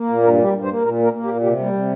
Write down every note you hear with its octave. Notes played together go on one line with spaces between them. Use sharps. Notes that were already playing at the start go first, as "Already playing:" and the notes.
Already playing: A#3
A#2
G2 A#4
G3
G4
G2
C5
A#3
A#2 A#4
A#3 A#4
A#3
G4
A#2
C3 G4
G3 A#3
C3